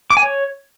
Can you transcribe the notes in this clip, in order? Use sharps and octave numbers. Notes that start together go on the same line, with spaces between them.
D6
G#5
C#5